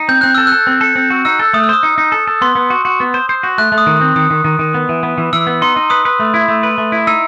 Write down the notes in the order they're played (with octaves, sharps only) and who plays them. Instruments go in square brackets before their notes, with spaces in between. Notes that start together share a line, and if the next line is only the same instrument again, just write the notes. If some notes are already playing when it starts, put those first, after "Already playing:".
Already playing: [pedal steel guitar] D#4
[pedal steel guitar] C4 [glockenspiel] G6
[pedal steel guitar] C4 [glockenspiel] F#6
[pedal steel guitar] A4 [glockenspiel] E6
[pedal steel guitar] A4 [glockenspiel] F#6
[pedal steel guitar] C4
A4
C4
F#4
[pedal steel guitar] D#4 [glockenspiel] E6
[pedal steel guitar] A4
[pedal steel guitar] A3 [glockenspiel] D#6
[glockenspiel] E6
[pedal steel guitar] C5 [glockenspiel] D#6
[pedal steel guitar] D#4
D#4
A4
A4
[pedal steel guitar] B3 [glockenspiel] C6
[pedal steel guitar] B3
F#4
F#4
B3
C5
C5
F#4
[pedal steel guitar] A3 [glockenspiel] F#6
[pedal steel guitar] A3
[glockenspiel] D#6
[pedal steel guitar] D#3
[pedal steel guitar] C4 [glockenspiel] D#6
[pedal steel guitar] D#3 [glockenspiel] D#6
[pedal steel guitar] D#3
D#3
D#3
B3
E3
B3
E3
[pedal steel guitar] E3 [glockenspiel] E6
[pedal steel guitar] B3
[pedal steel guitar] D#4 [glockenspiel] C6
[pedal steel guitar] D#4
[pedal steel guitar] B4 [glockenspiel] D#6
[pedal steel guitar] B4
A3
E4
A3
B4
A3
E4
[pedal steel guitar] D#4 [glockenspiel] E6